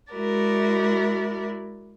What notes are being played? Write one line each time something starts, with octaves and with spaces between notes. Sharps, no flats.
G#3 E4 F#4 A#4 D5